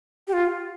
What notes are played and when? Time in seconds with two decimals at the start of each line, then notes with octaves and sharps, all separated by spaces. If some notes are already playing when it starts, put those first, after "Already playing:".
0.28 G4
0.33 F4